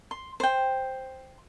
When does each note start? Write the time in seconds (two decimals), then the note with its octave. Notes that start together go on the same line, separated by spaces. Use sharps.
0.11 C6
0.40 C5 G5